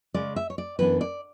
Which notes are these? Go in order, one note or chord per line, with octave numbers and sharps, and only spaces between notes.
C#3 G#3 C#4 D5
E5
C#5
D5
F#2 E3 B3 D4 B4
D5